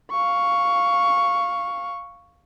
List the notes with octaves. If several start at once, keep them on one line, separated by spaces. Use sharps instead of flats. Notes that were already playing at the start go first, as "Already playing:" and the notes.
F5 C#6